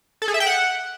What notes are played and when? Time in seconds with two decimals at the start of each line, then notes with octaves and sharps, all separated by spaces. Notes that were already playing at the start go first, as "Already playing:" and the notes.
0.22 A4
0.28 G#4
0.34 E5
0.40 G5
0.47 F#5